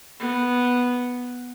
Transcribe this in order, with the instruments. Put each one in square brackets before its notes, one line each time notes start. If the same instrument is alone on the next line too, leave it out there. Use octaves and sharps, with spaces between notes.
[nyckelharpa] B3